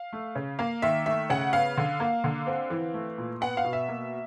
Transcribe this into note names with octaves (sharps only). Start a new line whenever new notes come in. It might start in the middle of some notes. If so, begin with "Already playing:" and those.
Already playing: F5
A3
C#3
A#3 F5
D#3 E5
A3 E5
C#3 F#5
B3 F5
D3
A#3
D3
C4
E3
A3
A#2
B3 F#5
F5
B2
E5
A#3